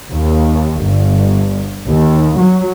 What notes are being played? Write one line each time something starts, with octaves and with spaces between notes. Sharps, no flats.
D#2
G1
D#2
F#3